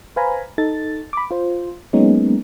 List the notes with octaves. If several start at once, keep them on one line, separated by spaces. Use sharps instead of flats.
B4 C5 F5 G#5 A#5 B5
D#4 A4 A6
B5 D6
F4 C5
F#3 G#3 A#3 B3 C#4 D#4